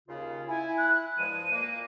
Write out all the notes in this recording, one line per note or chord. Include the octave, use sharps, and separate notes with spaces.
D#2 C#3 F4
E4 G#5
F#6
G2 F3 G#3 D#7
A#2 A#3